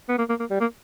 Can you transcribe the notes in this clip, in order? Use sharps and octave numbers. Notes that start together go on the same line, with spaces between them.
B3
A#3
A#3
A#3
G3
A#3